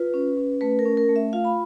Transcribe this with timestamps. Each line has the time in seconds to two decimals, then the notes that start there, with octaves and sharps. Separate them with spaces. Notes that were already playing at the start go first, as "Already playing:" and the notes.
Already playing: F4 B4
0.14 C#4
0.37 C#4
0.61 A3 B4
0.79 A#4
0.86 C#4
0.97 A#4
1.09 A3
1.16 E5
1.33 F4 F5
1.45 B5